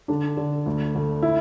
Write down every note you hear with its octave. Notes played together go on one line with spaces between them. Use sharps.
D3 D4
D3
D2
D2
E4